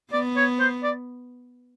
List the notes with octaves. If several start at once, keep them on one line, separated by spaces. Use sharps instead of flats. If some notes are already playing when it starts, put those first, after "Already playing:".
B3 D5
C#5
C5
D5